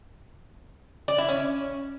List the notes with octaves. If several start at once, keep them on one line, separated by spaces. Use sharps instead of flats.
D5
E4
C#4